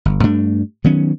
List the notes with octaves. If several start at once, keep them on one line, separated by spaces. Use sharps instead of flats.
G1
G2 A3 D4
D#3 F#3 B3 C#4